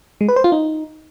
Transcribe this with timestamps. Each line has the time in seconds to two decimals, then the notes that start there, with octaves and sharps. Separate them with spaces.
0.21 G#3
0.29 B4
0.36 C5
0.44 F4
0.52 D#4